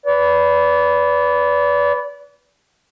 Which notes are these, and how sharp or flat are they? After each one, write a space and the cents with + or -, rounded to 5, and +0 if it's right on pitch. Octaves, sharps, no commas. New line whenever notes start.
B4 +0 D5 -30